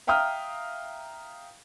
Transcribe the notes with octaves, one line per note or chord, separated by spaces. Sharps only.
E5 F5 G5 A#5 D#6 F6